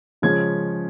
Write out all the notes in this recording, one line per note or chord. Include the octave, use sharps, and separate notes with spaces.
C#3 F3 G#3 C#4 G#6